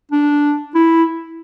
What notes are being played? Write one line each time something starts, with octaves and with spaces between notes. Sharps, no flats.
D4
E4